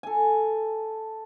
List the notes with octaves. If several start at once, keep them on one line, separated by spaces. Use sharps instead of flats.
A4 G#5